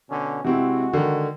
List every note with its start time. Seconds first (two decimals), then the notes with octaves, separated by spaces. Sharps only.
0.10 B2 D3 C#4
0.44 C3 G#3 C4 E4 F#4
0.93 D3 D#3